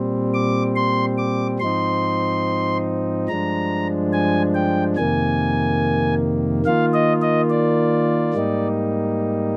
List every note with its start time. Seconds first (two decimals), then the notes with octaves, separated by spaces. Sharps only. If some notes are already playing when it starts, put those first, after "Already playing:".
Already playing: A#2 G3 C4
0.34 D6
0.76 C6
1.18 D6
1.59 G#2 F3 C4 D#4 C6
3.28 G2 F3 G#3 D4 A#5
4.13 G#5
4.55 G5
4.97 F2 C3 D#3 A#3 G#5
6.65 D#3 A#3 F4 F5
6.94 D#5
7.22 D#5
7.50 D5
8.34 G#2 G3 A#3 D#4